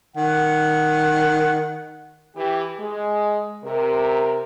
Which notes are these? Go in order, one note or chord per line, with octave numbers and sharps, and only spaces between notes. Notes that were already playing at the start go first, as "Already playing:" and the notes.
D#3 F#5
E3 G4
G#3
C3 A#4